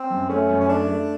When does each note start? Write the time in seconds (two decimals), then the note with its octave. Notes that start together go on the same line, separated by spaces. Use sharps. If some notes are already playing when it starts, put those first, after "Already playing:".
Already playing: C4
0.10 F#2
0.29 A3 C#4
0.49 F#2
0.60 C#4
0.68 A3 D4
0.88 A3